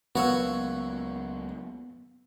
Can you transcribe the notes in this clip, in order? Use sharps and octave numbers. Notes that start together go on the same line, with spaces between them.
C#2 F#3 A#3 B3 F#4 C#5 F5 E6